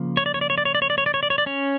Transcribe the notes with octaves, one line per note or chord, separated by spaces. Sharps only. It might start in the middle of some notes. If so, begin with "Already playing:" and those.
Already playing: C#3 F3 A#3
C#5
D5
C#5
D5
C#5
D5
C#5
D5
C#5
D5
C#5
D5
C#5
D5
C#5
D5
C#4 C#5